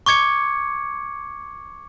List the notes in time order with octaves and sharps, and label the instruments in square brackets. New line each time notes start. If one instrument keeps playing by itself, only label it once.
[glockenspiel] C#6 D6 G#6 C#7